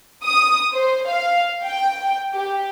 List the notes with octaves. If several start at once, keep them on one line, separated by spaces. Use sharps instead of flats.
D#6
C5
F5
G5
G4